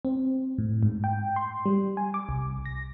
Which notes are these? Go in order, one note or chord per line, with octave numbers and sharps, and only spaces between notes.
C4
A2
G#2
G5
C6
G3
G#5
D6
C2
A#6